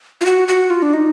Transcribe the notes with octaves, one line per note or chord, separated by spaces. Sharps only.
F4
F#4
F#4
F4
D4
D#4